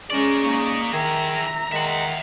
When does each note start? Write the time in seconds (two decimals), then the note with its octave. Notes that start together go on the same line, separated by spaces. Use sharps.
0.10 G#3 C#4 A#4 D5
0.43 A#3 D#4 D#5 C#6
0.93 D#3 E3 G#4 E5 A#5
1.72 D#3 G#3 E5 F#5